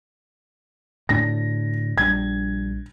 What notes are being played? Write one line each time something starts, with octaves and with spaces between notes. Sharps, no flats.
D2 A2 D4 A#6
A#1 G3 D4 G#6